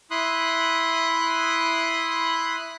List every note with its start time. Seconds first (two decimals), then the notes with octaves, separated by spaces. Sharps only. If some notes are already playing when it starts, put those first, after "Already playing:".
0.11 E4 B5 C6 D#6 F#6